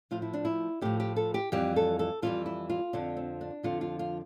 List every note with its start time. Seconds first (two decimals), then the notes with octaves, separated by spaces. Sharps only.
0.11 A2 F3 F4
0.22 E4
0.33 D4
0.45 E4
0.81 A2 F3 G4
1.00 G4
1.16 A4
1.34 G4
1.52 F2 E3 G3 G4
1.76 A4
1.99 A4
2.22 F2 E3 G3 F4
2.46 E4
2.70 F4
2.93 F2 D3 F3 D4
3.17 C4
3.41 D4
3.63 F2 D3 F3 F4
3.81 F4
3.99 F4